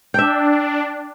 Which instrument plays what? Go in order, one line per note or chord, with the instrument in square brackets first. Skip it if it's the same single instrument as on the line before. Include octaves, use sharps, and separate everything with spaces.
[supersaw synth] D4 [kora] E5 G5